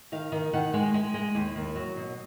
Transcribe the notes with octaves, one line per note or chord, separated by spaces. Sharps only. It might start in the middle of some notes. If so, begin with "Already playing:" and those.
D#3 F5
D#3
D#3 F#5
G#3
G#3
G#3
D#2
D#2
F#3
B2